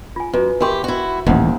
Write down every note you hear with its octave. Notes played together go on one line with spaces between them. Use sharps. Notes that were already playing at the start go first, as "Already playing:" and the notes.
F4 G#5
F#2 B4
E3 G4 A#4 C6 C#6
E4 F#4
D#1 A1 D#2 C5 F#5 D#6